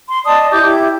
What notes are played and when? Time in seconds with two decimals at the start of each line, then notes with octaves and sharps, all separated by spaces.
0.09 C6
0.25 D5 D#5 A5 D#6
0.51 E4 G4 D6 G6
0.63 E4 G4